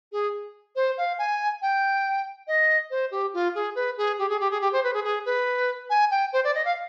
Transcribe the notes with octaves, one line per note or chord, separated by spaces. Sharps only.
G#4
C5
F5
G#5
G5
D#5
C5
G4
F4
G#4
B4
G#4
G4
G#4
G4
G#4
G4
C5
B4
G#4
G#4
B4
G#5
G5
C5
D5
D#5
F5